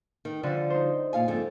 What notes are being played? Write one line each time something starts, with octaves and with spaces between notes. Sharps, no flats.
D#3
D3 F3 G3
D#4 C5
A#2 F5 G#5
F2 G#2 D3